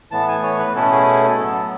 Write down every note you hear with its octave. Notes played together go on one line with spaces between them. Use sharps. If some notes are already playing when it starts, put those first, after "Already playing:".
A2 E3 B3 A5
G#5
C#5
B4
B2 A3 C#4 E4 A4
G#4
G#4
A4
A2 F#3 B3